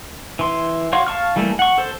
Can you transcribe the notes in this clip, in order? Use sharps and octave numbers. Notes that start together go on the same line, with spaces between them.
E3 C6
F#4 C#5 F5 C6 C#6
F5 A5 C#6 F6
E3 G3 A3 A#3 A4
F#5 C#6
A4 C5